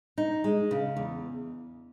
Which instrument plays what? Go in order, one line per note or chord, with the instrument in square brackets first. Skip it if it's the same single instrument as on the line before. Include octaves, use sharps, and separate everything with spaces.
[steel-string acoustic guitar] D#4
G#3
C#3
E2